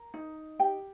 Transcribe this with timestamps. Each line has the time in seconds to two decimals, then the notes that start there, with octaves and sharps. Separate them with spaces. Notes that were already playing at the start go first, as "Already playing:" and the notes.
Already playing: A#4
0.14 D#4
0.60 G4 G5